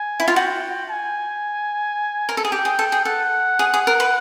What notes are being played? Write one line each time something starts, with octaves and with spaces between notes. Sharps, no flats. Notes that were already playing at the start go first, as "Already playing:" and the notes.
Already playing: G#5
E4
F4
F#4 G5
G#5
A#4
A4
G#4
G4 G5
G#4
A4
G#4
A4 F#5
G#4
G#4
A#4
B4